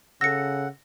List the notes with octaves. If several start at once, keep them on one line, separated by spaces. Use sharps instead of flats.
C#3 A4 F#5 E6 A#6 C#7